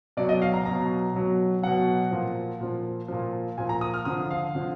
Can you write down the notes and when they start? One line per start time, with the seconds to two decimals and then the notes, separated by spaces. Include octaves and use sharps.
0.17 B2 F#3 D5
0.29 D#5
0.42 F5
0.54 A#5
0.65 B2 F#3 A#5
1.15 B2 F#3
1.63 B2 F#3 F#5
2.11 A#2 F3
2.61 A#2 F3
3.08 A#2 F3
3.58 A#2 F3 G#5
3.69 A#5
3.81 D#6
3.94 F6
4.05 D3 F3 D#6
4.31 F5
4.55 D3 F3